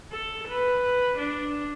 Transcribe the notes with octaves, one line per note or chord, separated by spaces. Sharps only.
A4
B4
D4